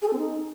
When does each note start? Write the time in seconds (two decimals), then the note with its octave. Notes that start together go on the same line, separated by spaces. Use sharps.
0.02 G#4
0.08 A4
0.13 C4
0.19 D#4